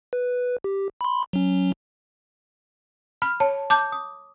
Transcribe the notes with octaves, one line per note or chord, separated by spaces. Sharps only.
B4
G4
B5 C6
F#3 C#4
B5 F6
C#5 A5
A5 D6 G6
D#6